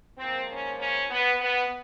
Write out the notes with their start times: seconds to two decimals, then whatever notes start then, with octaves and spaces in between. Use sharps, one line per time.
0.18 G#2 F3 A#3 C4
0.49 C#4
0.79 C#4
1.10 B3
1.41 B3